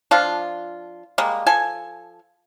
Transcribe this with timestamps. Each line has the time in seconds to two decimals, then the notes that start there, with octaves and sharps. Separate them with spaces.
0.11 F3 D4 F4
1.18 G3 G#3 A#3
1.46 F3 A4 G#5